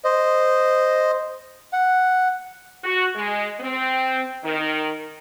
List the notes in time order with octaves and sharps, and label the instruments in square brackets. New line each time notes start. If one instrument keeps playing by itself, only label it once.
[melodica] C5 D#5
F#5
[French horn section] F#4
G#3
C4
D#3